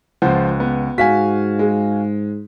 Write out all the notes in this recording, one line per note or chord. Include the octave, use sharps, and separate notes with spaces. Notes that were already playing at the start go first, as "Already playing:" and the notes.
C#2 F3 F4 C5 F#5
B3
G#2 F#4 F5 G#5 B6
G#3